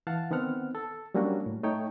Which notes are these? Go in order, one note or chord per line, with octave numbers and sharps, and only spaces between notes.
E3 F5 F#5 A5
D#3 B3 C4 F#5 F6
A4
F#3 G3 A#3 C#4 D4 F#4
A2
A3 D#4 C#5 G5